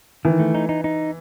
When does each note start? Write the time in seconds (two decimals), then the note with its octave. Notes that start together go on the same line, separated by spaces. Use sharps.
0.25 D#3 E3
0.40 A3
0.55 D#4
0.69 D#4
0.84 D#4